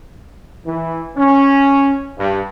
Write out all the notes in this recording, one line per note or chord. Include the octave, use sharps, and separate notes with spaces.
E3
C#4
G2